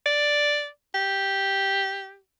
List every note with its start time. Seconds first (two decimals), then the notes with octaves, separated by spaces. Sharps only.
0.06 D5
0.95 G4